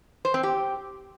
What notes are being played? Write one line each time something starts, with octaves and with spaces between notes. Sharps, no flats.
C5
C4
G4